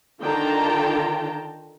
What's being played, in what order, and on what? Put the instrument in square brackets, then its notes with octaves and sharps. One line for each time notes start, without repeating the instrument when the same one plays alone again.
[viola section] D3 D#3 F4 G5 A5 A#5